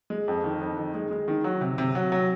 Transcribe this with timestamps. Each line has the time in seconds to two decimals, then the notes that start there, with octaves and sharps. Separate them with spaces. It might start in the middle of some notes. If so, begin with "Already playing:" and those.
0.10 G#3
0.28 F2
0.44 D#3
0.61 F2
0.77 D#3
0.95 G#3
1.11 G#3
1.28 D#3
1.44 F#3
1.61 C3
1.78 C3
1.95 F#3
2.12 F#3